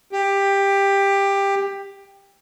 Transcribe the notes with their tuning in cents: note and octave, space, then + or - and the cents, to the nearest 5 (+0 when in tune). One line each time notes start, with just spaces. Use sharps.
G4 +15